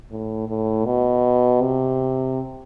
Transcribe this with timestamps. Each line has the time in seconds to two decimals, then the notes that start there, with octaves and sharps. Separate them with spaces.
0.11 A2
0.48 A2
0.86 B2
1.61 C3